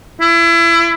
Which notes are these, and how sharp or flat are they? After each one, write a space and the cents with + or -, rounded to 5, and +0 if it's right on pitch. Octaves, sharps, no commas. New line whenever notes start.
E4 +30